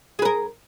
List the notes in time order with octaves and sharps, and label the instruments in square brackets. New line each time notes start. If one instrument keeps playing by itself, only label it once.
[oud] G#4
B4
A#4